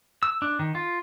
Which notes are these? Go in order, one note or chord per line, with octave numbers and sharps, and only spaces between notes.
E6
D4
D#3
F4